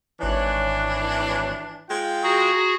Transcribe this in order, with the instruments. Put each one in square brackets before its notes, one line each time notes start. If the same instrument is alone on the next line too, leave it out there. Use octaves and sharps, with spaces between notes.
[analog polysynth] G#1 C#5 F#6 [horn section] E3 D4
[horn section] G#3 F4 G5
[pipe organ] F#4 G#4 [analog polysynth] A#5